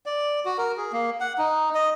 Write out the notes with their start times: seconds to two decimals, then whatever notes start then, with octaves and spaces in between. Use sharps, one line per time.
0.06 D5
0.45 F#4
0.58 A#4
0.77 G#4
0.92 A#3
1.20 F#5
1.38 D#4
1.75 D#5